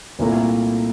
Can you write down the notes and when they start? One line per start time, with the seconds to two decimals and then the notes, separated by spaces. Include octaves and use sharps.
0.19 C2 A#2 A3 E4 A#4